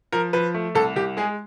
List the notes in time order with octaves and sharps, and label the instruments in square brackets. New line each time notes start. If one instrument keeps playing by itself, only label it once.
[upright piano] F3 A#4
F3 B4
A3
C2 A4
C2 G4
G#3 G#4